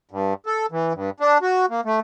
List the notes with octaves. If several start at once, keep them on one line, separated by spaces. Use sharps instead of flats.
G2
A4
E3
G2
D4
F#4
A#3
A3